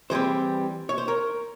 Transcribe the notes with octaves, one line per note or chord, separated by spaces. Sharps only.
E3 G3 C4 G#4 C5
C#5
C5
A#4 C#5